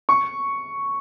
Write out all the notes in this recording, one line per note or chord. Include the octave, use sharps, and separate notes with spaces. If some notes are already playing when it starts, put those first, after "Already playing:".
C#6